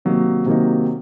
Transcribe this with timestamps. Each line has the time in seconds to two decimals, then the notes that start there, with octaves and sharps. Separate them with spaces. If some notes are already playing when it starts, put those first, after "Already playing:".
0.05 C3 D#3 F#3 A#3 D#4
0.46 C3 D#3 F#3 A#3 D#4